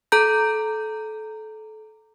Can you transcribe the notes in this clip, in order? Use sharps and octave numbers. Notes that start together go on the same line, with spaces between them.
A4 A#5 G6